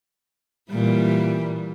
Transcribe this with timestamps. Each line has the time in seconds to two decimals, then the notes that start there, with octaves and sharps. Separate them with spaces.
0.71 A#2 E3 G3